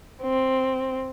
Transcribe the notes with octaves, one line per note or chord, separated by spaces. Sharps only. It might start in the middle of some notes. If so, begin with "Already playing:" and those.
C4